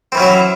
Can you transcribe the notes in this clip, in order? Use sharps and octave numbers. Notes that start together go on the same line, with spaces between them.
E3 F#3 C4 C#4 E4